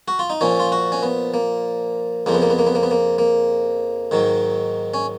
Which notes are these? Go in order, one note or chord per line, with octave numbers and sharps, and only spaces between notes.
F#4
F4
D#4
A#2 F3 C#4
F4
F#4
C#4
B3
A#3
F2 C#3 F3 A#3
B3
A#3
B3
A#3
B3
A#3
B3
A#3
A#3
G#2 D#3 F#3
C#4